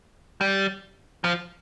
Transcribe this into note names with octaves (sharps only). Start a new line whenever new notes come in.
G3
F3